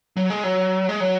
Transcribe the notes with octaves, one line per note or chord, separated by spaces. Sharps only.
F#3
G#3
F#3
G#3
F#3